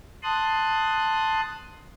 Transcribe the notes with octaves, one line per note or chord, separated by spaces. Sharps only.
A5 C6 D#6 F#6